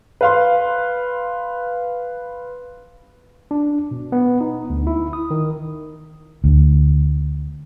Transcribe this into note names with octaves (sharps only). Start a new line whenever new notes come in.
B4 F5 C6
D4
B2
B3
D#4
D2
E4
D#6
D#3
D2